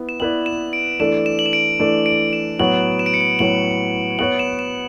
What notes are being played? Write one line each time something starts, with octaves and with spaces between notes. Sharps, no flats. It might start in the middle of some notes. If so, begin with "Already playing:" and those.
Already playing: B3 E4
E7
B3 E4 B4 D5 F#7
E7
D7
E3 A3 D4 A4 D5 E7
E7
F#7
E7
D7
E3 A3 D4 A4 D5
D7
E7
A2 F#3 B3 F#4 C#5 F#7
E7
D7
C#7
D7
A2 F#3 B3 F#4 C#5 F#7
B3 F#4 C#5 F#7
E7
E7